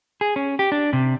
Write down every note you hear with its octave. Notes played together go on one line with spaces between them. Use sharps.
G#4
C#4
G4
D4
C3